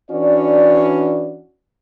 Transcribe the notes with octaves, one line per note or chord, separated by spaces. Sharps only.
E3 C#4 D4 F#4 D5